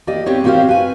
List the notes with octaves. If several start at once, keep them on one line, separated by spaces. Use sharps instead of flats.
A#3 G4 D5 D#5
B3 C4 G4 C#5
A#3 C4 F#4 G4 C5 F5
B4 G#5